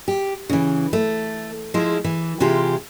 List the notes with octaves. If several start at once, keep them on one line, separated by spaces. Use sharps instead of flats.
G4
C#3 E3
A3
F3 G#3 E4
E3
C3 E3 G#3 F4 G4